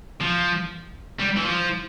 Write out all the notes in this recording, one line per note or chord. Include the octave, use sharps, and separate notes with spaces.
F3
G3
E3
F3